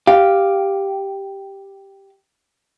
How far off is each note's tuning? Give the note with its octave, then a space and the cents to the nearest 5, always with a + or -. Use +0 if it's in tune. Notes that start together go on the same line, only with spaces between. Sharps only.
G4 +0 F5 +0